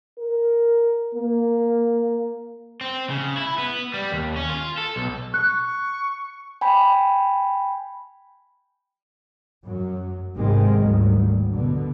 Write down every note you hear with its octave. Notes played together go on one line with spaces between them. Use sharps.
A#4
A#3
C4
C#3
E4
B3
G3
D#2
C#4
F4
A4
B1
C#6 F#6
G5 G#5 B5
F#2 F#3
G#1 C3 D#3 G#3 C4
G#1 D2 D#3 F#3 G3
B2 D3